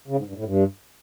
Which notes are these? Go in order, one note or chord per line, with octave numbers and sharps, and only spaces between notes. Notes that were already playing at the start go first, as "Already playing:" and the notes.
C#3
G#2
G2
A2
G2